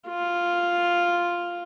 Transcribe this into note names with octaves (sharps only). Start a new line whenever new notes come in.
F4